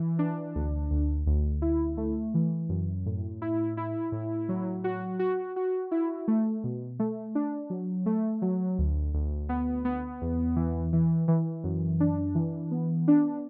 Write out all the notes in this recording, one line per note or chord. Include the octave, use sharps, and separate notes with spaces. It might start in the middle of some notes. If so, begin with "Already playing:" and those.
Already playing: E3
D4
D2
D2
D2
E4
A3
E3
F#2
A2
E4
E4
A2
F#3
F#4
F#4
F#4
E4
A3
B2
A3
D4
F#3
A3
F#3
D2
D2
B3
B3
E2
E3
E3
E3
F#2
D4
E3
B3
D4